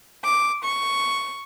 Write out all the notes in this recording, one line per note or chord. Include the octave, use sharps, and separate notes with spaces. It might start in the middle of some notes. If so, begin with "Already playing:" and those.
D6
C#6